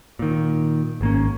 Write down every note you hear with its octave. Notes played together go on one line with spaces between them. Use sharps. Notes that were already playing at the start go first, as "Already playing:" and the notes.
A#2 D#3
G#1 A#3 C#4